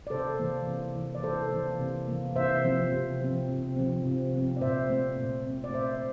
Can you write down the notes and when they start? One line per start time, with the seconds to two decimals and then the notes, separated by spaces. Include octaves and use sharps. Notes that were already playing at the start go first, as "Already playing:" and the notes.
0.07 D5
0.10 C3 A4 C5
0.39 E3 A#3
0.67 C3
0.95 E3 A#3
1.15 D5
1.23 C3 A4 C5
1.52 E3 A#3
1.80 C3
2.08 E3 A#3
2.36 C3 C5 E5
2.65 F3 C4
2.92 C3
3.21 F3 C4
3.49 C3
3.77 F3 C4
4.05 C3
4.34 F3 C4
4.56 D5
4.61 A#2 C5 E5
4.89 A3 C4
5.18 A#2
5.46 A3 C4
5.64 D5
5.74 A#2 C5 E5